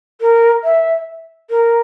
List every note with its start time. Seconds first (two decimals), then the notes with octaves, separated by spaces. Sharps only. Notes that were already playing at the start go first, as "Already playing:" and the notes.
0.21 A#4
0.64 E5
1.50 A#4